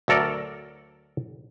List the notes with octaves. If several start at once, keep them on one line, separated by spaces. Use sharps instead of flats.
D2 F#3 A4 A#4 D5